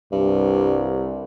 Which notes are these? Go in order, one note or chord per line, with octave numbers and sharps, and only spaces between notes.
C2 G2